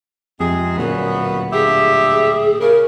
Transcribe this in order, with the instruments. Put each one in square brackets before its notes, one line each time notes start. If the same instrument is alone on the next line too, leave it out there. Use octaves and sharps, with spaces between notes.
[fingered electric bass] F2 [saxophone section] C3 G#3 G#4
[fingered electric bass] D1 A#2 [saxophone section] F#2 C#3 B3
[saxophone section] G2 G4 E5 [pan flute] G#4
[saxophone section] C#3 [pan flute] A#4